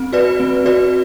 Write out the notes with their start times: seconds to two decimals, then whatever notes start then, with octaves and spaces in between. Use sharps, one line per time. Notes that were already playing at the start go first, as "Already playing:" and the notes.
Already playing: C4
0.13 F#4 B4 D5
0.40 C4
0.66 F#4 B4 D5